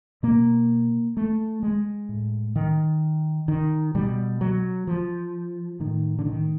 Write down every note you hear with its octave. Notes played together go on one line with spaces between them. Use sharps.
B2 A#3
A3
G#3
A2
D#3
D#3
B2 G3
F#3
F3
A2 D#3
D3
D#3